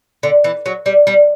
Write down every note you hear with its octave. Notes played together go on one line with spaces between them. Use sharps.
D3
E3
F#3
G3
G3